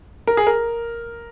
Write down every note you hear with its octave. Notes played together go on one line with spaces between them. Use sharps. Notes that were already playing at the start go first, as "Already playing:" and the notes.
A#4
G#4
A#4